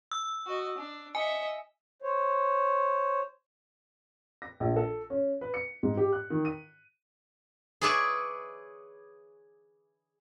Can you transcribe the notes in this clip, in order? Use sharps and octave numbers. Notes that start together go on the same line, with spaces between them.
E6
F#4 D#5
D4
D#5 E5 G#5
C5 C#5
A#6
A#1
A4
C#4
B4
C#7
G#2
G4
F#6
D#3
D#7
G#4 B4 C#5 D5 E5 G#5